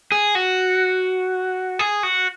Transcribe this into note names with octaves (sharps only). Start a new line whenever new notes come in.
G#4
F#4
G#4
F#4